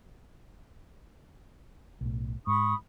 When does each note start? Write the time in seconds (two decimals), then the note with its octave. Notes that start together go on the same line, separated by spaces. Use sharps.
2.01 B1 A2
2.47 G#2 B5 C#6 D#6